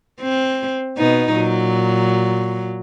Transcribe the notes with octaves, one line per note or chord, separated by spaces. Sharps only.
C4
B2 B3 D#4
A#2 F#3